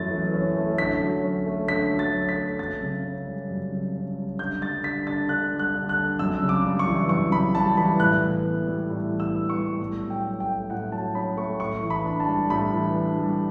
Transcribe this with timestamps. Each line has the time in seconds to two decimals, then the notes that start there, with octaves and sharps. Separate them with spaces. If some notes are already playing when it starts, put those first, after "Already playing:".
Already playing: F#2 E3 A3 C#4 A6
0.11 E3
0.34 C#4
0.57 A3
0.78 D3 B6
1.02 F#3
1.24 C#4
1.46 A3
1.68 D3 B6
1.91 F#3
1.99 A6
2.14 C#4
2.29 B6
2.36 A3
2.59 F#2 A6
2.82 C#3
3.04 C#4
3.26 G3
3.49 F#2
3.72 C#3
3.94 C#4
4.16 G3
4.39 D3 G6
4.62 G3 A6
4.84 D3 B6
5.07 D4 A6
5.29 D3 F#6
5.52 G3
5.59 F#6
5.74 D3
5.89 F#6
5.97 D4
6.19 F#2 E6
6.42 C#3
6.49 D6
6.65 G3
6.79 C#6
6.87 E3
7.09 F#2 C#6
7.32 C#3 B5
7.54 G3 A5
7.77 E3 B5
8.00 A2 F#6
8.22 E3
8.45 B3
8.67 G3
8.90 A2
9.12 E3
9.20 E6
9.35 B3
9.49 C#6
9.58 G3
9.80 A2
10.02 F#3
10.10 G5
10.25 C#4
10.40 G5
10.47 A3
10.70 A2 F#5
10.92 F#3 A5
11.15 C#4 B5
11.37 A3 C#6
11.60 A2 C#6
11.83 E3
11.90 B5
12.05 D4
12.20 A5
12.28 G3
12.50 A2 B5
12.73 E3
12.95 D4
13.18 G3